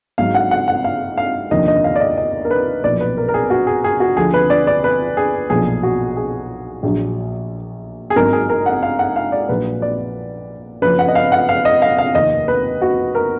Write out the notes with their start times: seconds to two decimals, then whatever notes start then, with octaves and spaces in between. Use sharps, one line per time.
0.18 G#1 G#2 F#3 F5
0.34 F#5
0.51 F#5
0.68 F#5
0.84 F5
1.17 F5
1.51 F1 D#2 D3 F3 D#5
1.68 D#5
1.84 F5
1.96 D5
2.00 D#5
2.17 D#5
2.45 A#4
2.51 B4
2.84 B1 A#2 F3 D5
3.00 B4
3.17 A#4
3.29 A#4
3.34 G#4
3.50 F#4
3.67 G#4
3.84 G#4
4.00 F#4
4.17 D2 D3 F3 G#4
4.34 B4
4.50 D5
4.67 D5
4.84 B4
5.17 G#4
5.50 B1 A#2 F3 G#4
5.83 F#4
6.17 G#4
6.83 A#1 A#2 F#3
8.10 G#4
8.16 G#1 G#2 F#3 A#4
8.33 G#4
8.50 A#4
8.66 F#5
8.83 F5
8.99 F#5
9.16 F5
9.32 D5
9.49 A#1 A#2 F#3 B4
9.82 D5
10.82 F#1 F#2 F3 B4
10.99 F#5
11.08 D#5
11.15 F5
11.32 F#5
11.49 F5
11.65 D#5
11.82 F5
11.98 F5
12.15 F1 D#2 D#3 D#5
12.48 B4
12.82 F#4
13.15 A#4